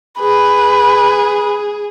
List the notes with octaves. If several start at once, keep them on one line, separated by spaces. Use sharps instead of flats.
G#4 B4